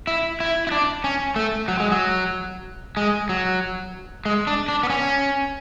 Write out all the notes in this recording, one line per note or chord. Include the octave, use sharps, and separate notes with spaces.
E4
E4
E4
D4
C#4
A3
F#3
G#3
F#3
G#3
F#3
G#3
D4
D4
B3
C#4